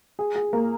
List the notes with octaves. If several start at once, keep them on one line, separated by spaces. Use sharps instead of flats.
G#4
G#4
A#3